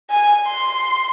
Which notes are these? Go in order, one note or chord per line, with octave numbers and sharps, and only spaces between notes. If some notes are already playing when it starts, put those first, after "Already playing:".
G#5
C6